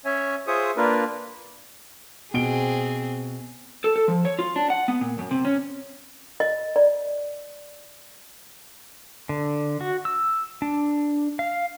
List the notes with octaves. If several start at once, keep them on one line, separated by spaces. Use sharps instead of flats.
C#4 C#5 E5 G#5
F4 G#4 C5 E5 C#6 D#6
A#3 D4 F4 A#4 B4
B2 C4 G#4 D7 G7
A4
A4
F3
C#5
F4
D4
F#5
B3
A#2
F#2
C3
C#4
D#5
D5
D3
F#4
E6
D4
F5